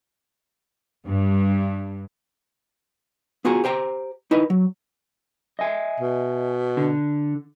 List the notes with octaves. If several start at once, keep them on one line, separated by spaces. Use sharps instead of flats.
G2
B3 F4 F#4 G#4 F#5 A#5
G4 C5 G5 A#5
D#4 E4 B4 D#5
F#3
D#5 E5 G#5
B2
D3